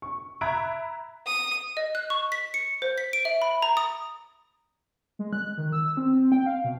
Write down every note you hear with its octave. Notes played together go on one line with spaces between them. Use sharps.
C#6
E5 A#5 B5 F#6 G#6 D7
D#6
D#5
F#6
C#6
B6
C#7
C5
B6
D7
E5
B5
A#5
D#6
G#3
F#6
D#3
E6
C4
C4
G5
F5
B2